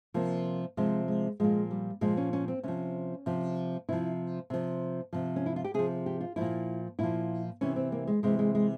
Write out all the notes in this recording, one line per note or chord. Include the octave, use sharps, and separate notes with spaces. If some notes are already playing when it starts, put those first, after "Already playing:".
C3 F3 A#3
C3 F3 G#3
G#3
A#2 F3 G#3
G3
A#2 F3 G#3
C#4
C#4
C4
C3 F3 C#4
C3 F3
C3 F3 E4
C3 F3
C3 F3
C#4
E4
F4
G4
C3 F3 G#4
G4
F4
A#2 F3 E4
A#2 F3 E4
C3 E3 C#4
C4
A#3
G#3
C3 E3 G#3
G#3
G#3